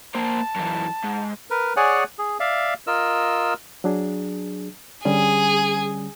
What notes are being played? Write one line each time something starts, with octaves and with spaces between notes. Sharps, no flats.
A#3 C5 A5
F#2 E3
G#2
A#4 B4
G#4 C#5 D5 F#5 G#5
G#4
D5 E5 F5
F4 A#4 D#5 E6
F#3 D4 G#4
D3 G3 C#4 G#4